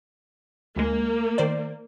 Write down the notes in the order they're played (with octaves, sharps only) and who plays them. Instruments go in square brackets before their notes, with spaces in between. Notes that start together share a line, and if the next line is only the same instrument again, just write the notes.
[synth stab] D2 G#3 [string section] A#3
[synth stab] D#3 C5 D5